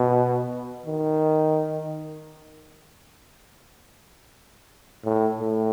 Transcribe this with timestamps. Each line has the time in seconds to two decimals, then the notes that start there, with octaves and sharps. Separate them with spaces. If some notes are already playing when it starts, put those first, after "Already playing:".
Already playing: B2
0.86 D#3
5.04 A2
5.40 A2